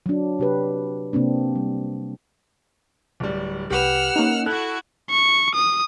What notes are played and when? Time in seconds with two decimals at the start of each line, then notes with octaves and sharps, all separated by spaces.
0.06 F#3 D4
0.39 C3 G4 B4
1.13 C3 A#3 C4 D4
1.55 G3
3.20 D1 G3
3.70 C2 G4 B4 F#5 E6 F6
4.16 A#3 C#4 D#4
4.46 E4 F#4 A4 F#6
5.11 C#6
5.55 D#6